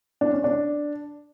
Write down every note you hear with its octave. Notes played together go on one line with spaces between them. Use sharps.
D4
C#4
D4